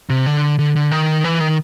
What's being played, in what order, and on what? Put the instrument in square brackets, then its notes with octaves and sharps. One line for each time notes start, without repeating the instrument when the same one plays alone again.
[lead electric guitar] C3
D3
D3
D3
D#3
E3
D#3